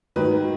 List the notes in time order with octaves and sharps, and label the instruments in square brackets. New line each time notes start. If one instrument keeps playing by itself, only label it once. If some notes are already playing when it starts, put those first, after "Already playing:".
[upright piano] G#2 D#3 F#3 B4